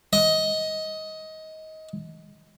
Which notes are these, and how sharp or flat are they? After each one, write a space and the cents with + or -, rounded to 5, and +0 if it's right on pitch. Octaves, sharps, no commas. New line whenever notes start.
D#5 +20